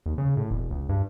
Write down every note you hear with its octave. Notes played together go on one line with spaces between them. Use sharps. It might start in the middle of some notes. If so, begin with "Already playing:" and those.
D#2
C#3
A2
E1
C#2
G2